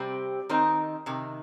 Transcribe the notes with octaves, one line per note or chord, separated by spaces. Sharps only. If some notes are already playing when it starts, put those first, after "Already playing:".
Already playing: C3 G3 C4 G4
D#3 C4 D#4 A#4
C3 D#3